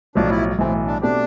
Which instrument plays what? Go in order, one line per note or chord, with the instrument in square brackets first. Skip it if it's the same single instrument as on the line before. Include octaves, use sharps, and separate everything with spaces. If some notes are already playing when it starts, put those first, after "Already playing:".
[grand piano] B1 A2 F3 [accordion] D4
[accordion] E4
[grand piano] B1 A2 E3 [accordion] C4
[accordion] D4
[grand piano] B2 A3 C4 G4 C5 [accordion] D4